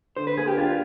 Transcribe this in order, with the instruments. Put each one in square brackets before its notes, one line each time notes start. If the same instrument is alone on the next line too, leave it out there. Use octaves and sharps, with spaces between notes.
[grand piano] D3 [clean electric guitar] C5
[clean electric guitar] B4
[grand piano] A#3 [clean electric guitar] G#4
[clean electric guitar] G4
[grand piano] D4 [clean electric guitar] F4